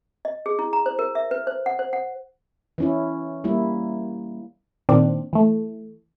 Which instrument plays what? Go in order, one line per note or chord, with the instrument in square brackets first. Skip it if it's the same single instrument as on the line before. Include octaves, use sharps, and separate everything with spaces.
[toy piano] D#5
G#4
E4
A#5
C5
A#4
E5
B4
C5
F#5
C5
F#5
[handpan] E3 C#4 E4
G3 A#3 E4
[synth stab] A#2 D#3 C4 D4
E3 A3